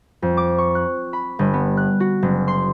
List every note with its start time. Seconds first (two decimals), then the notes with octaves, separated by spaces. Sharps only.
0.22 F2
0.37 D6
0.58 C#6
0.75 F#6
1.13 B5
1.39 G1
1.54 B3
1.77 F#6
2.00 F#4
2.22 F#1
2.48 C6